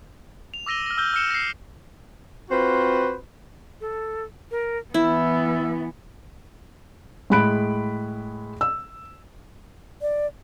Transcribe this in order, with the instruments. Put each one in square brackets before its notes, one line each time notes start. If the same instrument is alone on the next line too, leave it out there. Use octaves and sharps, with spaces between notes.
[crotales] F7
D6 E6 A#6 D#7 G7
F6 A#6
E6 F6 G6 G7
E6 F6 C#7 E7
A#6 C7
[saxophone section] C4 F4 F#4 B4 C5
[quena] A4
A#4
[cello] E3 B3 [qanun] E4 [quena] E6
[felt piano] A2 G#3 B5 F#6 D7
E6
[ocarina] D5